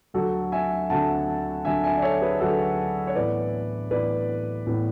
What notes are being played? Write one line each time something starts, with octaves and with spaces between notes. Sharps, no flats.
D2 D3 F#3 F#4 A4
E5 G#5
D2 D3 F#3 F#5 A5
D2 D3 F#3 E5 G#5
E5 G#5
D5
A4 C#5
G#4 B4
D2 D3 F#3 F#4 A4
C#5
A2 E3 B3 B4 D5
A2 E3 B3 B4 D5
A2 E3 B3